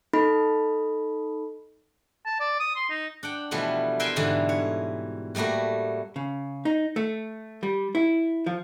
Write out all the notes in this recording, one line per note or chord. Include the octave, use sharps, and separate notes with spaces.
D#4 A4 B5
A5
D5
D#6
C6
D#4
D4 F#5 G5
B2 E3 F3 G3 A3 B3
A#4 B4 E5 G5 G#5 C6
G#2 B2 D3 E3 G3 G#3
C#5
A2 G3 A3 A#3 F#4
C#3
D#4
A3
G3
E4
F3